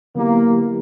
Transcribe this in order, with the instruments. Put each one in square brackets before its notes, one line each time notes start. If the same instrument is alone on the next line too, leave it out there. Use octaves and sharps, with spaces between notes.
[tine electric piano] D3 F#3 B3 E4 G4 [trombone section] A#3